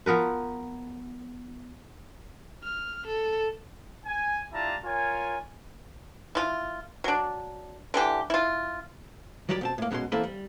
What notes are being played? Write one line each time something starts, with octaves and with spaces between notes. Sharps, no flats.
F3 B3 A#4 B4
F6
A4
G#5
D4 E4 F4 G4 A5 A#5
F4 A#4 C#5 G#5
E4 F4
F#3 D4
D3 E3 G4
E4 F4
D#3 F#3 G3 G4 C#5 D5
B2 C4 A5
A2 A#3
F#2 B2 F#3 G#3 C6
E2 A#3 C4 E4 A4 B4
G3